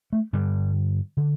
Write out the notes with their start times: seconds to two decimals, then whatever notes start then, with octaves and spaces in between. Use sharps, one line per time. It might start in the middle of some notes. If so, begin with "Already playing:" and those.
0.13 A3
0.33 G2 D3 G3
1.17 D3